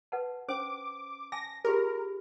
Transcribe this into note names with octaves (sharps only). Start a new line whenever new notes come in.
B4 F#5 A5
C#4 C5 D6
G#5 A5 D6 A#6
F4 G4 G#4 A#4